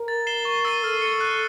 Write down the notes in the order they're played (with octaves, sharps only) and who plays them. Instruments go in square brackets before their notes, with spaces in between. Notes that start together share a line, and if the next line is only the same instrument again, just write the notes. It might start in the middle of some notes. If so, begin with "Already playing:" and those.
Already playing: [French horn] A#4
[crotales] A6
C7 E7 G7
C#6
E6 A6 C7 D#7
[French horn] A4 [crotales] F6
[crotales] A6 C#7
F#6